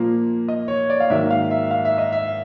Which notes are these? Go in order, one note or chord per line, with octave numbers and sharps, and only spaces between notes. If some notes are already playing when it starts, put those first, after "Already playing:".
Already playing: A#2 F3 A#3
D#5
C#5
D5
F5
G#2 D#3 F#3 A#3 E5
F5
E5
F5
E5
D#5
E5